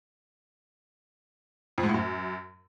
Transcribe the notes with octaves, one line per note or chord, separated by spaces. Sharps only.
F2
G#2
A2
F#2